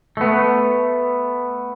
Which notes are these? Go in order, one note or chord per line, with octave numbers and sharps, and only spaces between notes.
A3 B3